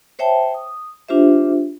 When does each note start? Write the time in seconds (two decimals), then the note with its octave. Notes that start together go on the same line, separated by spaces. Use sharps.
0.19 C5 C#5 E5 G5 A5
0.54 D#6
1.09 D4 F4 G4 C5 E5